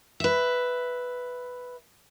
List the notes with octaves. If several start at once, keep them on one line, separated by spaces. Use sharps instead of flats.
B4 E5